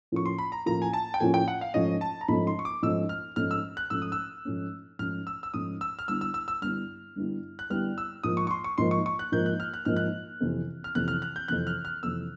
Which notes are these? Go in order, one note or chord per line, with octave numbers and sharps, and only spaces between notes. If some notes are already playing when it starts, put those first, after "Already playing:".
A2 F3 A#3 C#4 F4 C#6
C6
B5
A#5
A2 F3 A#3 C#4 F4 A#5
G#5
A5
G5
A2 F3 A#3 C#4 F4 G#5
G5
F#5
F5
G#2 F3 A3 C#4 D#5
A5
A#5
G#2 F3 A3 C#4 B5
C6
C#6
D6
G#2 F3 A3 C#4 E6
F6
G#2 F3 A3 C#4 F6
E6
F#6
G#2 F3 A3 C#4 E6
D#6
E6
G#2 F3 A3 C#4
G#2 F3 A3 C#4 F6
E6
E6
G#2 F3 A3 C#4 D#6
E6
F6
G2 D3 G3 B3 E4 E6
E6
E6
E6
G2 D3 G3 B3 E4 F6
G2 D3 G3 B3 E4
F#6
G2 D3 G3 B3 E4 F6
E6
G#2 F3 A#3 D#6
C#6
C#6
C6
C#6
G#2 F3 A#3 C6
C#6
C#6
F#6
G#2 F3 A#3 G6
F#6
F6
F#6
G#2 F3 A#3 F6
F#6
F2 C3 E3
F6
F2 C3 E3 F#6
F6
F#6
G6
F2 C3 E3 F#6
F6
F6
F2 C3 E3 E6